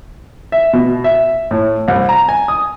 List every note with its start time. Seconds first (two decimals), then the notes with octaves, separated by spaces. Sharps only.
0.52 E5
0.73 B2
1.04 E5
1.51 A2
1.88 C2
2.09 A#5
2.29 G#5
2.48 D#6